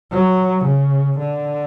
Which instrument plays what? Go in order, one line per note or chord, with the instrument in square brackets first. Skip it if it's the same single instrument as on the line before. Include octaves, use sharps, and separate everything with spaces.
[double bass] F#3
C#3
D3